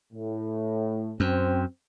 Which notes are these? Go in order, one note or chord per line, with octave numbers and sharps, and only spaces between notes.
A2
F#2 C4